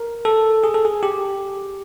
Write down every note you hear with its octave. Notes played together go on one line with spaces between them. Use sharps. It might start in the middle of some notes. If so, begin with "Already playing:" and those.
Already playing: A#4
A4
G#4
A4
G#4
G4